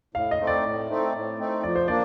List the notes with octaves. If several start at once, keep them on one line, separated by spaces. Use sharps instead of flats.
A2 F5
D#5
A3 C4 D#4
D5
A2
A3 C4 D#4
A2
A3 C4 D#4
F3 D5
C5
A#3 D4 D5